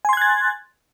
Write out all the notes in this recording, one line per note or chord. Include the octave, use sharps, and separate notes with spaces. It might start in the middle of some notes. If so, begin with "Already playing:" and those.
G#5 C6 F#6 G#6 A6